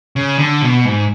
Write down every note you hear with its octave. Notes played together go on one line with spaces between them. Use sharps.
C#3
D3
B2
G#2